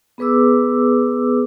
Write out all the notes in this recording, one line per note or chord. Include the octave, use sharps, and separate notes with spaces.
B3 G#4 B4 D6 E6